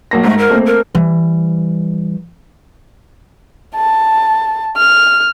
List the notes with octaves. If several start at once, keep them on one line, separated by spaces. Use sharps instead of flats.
B1 A#3 A#6
G#2 A3
A#4
A3 A#3 C4
A#4
E3 G3
A5
F6